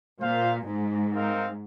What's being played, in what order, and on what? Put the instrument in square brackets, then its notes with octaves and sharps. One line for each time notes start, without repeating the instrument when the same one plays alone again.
[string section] A#2 [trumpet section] F4 C5 F5
[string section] G#2
[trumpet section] C4 D#4 A#4 F5